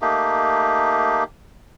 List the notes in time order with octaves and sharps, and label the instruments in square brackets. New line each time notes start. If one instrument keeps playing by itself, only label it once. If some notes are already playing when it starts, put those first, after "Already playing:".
[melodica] A3 A#3 D#4 G4